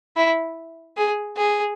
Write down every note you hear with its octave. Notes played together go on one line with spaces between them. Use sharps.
E4
G#4
G#4